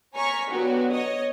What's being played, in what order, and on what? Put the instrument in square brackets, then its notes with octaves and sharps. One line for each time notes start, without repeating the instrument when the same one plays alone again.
[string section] C#5 G#5 A#5 C#6 F6 B6
D3 F#3 B3 F#4 G4
C#5 D#5 D#6